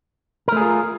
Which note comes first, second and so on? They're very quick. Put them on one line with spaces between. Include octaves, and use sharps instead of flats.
A#4 A3 G#4 F4